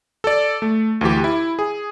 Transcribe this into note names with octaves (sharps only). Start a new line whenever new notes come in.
A4 D5
A3
D2 E3 G4
E4
G#4